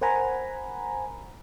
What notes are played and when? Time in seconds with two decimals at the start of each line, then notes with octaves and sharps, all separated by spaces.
0.01 A#4 C5 F#5 G#5 A#5 B5